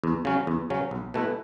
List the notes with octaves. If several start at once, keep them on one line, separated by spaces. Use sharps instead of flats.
E2
C#3 F#3 C#4
E2
C#3 F#3 C#4
B1
B2 A3 E4 B4